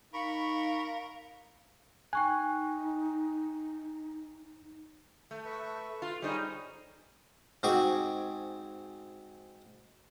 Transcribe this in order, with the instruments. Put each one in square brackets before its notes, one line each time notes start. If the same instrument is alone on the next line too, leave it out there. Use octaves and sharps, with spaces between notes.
[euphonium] D#4 [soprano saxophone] A#4 [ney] F5 [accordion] B5 C#6
[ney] D#4 [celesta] G5 C#6 F#6 [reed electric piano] G#5
[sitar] A3
[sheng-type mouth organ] B4 E5 C#6
[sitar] F4
[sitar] G3 D#4 [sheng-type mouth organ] G#4 C5 C#5
[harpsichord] G#2 C4 F#4 G#4 C#6 D6